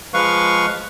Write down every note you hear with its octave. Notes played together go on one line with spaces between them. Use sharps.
F3 G#3 B4 F5 C#6